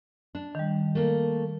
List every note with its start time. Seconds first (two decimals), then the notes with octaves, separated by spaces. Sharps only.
0.35 D4
0.55 D#3 G3
0.95 A3 A#3